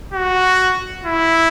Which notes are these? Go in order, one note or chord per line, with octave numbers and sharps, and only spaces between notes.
F#4
E4